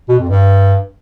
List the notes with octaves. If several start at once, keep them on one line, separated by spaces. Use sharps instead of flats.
B2
F2
G2